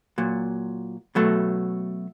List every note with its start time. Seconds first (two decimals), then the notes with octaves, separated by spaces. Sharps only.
0.18 A#2 F#3
1.15 B2 F#3 A3